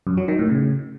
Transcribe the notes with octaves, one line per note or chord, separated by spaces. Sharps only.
F#2
F#3
D#3
A2
C#3